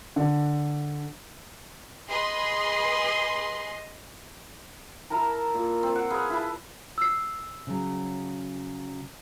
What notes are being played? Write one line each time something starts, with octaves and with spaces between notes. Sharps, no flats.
D3
G#4 B4 D#5 C6
E4 A#4 A5 A#5
A#2
C4
F#5
G#4 B4 F5
E4 A5
E6 C7
C#3 F#3